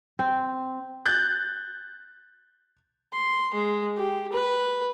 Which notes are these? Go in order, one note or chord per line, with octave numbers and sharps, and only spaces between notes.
C4
F#6 G6 A6
C6
G#3
G4
B4